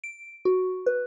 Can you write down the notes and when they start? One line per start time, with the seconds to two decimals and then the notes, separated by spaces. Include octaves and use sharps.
0.04 D7
0.45 F#4
0.86 B4